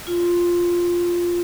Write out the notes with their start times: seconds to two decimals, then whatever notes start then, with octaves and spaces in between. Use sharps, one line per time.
0.07 F4